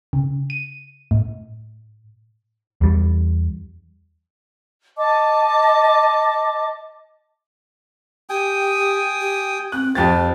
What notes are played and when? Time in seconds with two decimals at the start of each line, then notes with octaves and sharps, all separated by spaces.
0.13 C#3
0.50 D#7
1.11 A2
2.81 E2 G3
4.97 D#5 A5 D6
8.30 G4 G5 G#5 D#6
9.21 G4
9.72 C4 F#6
9.95 F2 G4 C5 A6